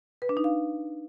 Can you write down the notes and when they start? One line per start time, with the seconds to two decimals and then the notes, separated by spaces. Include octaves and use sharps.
0.22 B4
0.29 D4
0.37 D#4
0.44 F5